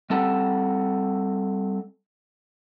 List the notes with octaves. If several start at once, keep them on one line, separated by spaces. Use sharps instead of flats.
G3 C4 A4 F#5